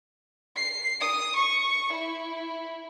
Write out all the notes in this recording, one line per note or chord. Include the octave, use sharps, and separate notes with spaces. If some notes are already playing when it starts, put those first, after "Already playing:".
C7
D#6
C#6
E4